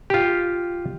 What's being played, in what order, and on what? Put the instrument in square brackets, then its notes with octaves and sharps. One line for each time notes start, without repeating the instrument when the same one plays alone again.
[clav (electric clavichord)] F4 G4